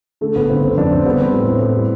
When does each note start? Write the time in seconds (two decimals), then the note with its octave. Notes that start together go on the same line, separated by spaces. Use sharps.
0.21 D3 A3
0.35 G1 B3
0.49 G1 C4
0.63 D3 C4
0.77 F2 D4
0.91 G1 C4
1.05 G3 B3
1.20 C4 D4
1.33 A2 C4
1.48 A2
1.61 A2
1.76 G3